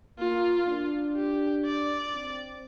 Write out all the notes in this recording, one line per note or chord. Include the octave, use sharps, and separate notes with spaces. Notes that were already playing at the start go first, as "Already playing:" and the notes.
A#3 F4
D4
G4
D5
C4